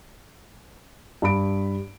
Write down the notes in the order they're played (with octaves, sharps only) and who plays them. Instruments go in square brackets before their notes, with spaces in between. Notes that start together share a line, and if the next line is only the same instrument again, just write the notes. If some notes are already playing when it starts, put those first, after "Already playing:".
[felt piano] G2 D4 B5 D7